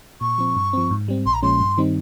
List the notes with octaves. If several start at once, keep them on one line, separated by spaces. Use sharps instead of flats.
A#2 C#6
F3 C4
G2
F3 C4
G#2
G3 C4
A#1 C6
A#5
A#2 F3 G#3 C#4 C6
G2
D#3 G3 C4 D#4